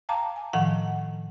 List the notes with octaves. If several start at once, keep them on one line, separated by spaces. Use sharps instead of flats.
F5 G5 A5 A#5 D6
G#5
A2 D#3 F3 F#5